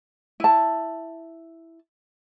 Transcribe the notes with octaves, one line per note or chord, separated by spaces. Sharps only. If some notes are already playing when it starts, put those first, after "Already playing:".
E4 A5